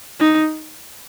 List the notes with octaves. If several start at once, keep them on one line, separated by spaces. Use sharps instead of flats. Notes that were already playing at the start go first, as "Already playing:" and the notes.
D#4